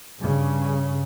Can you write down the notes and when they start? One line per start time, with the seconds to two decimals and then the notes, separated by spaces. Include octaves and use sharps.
0.20 G2 C#3